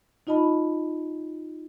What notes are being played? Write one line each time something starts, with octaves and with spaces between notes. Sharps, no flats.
D#4 F4 D#5 A5 B5